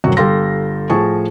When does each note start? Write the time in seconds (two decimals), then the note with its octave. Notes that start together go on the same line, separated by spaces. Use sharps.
0.04 D#1 F#2 C3 F#3 F#4
0.17 G1 G4 A4 F5 C6 A#6
0.90 A2 F3 G#4 A5 C#6